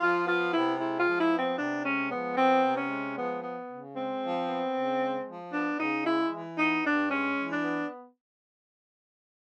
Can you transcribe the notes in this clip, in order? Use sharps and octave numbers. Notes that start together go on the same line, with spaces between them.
F3 F4
B3 F4
C3 E4
G#3 E4
F4
F3
E4
B3
C4
C3 D4
G#3 C#4
F3 B3
B3 C4
C3
C#4
G#3
F3 B3
B3
C#3
G#3 C4
F3
B3
C#3
G#3
F3
B3 D4
C#3 D#4
G#3 E4
E3
B3 D#4
G2 D4
G#3 C#4
E3
D4
B3